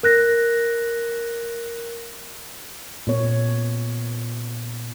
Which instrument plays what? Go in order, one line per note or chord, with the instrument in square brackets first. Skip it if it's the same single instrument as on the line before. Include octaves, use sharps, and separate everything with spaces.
[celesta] A#4 F#6 A#6
[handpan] A#2 B3 C#5